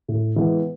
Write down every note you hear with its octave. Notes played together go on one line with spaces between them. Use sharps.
A2
E3 G#3 B3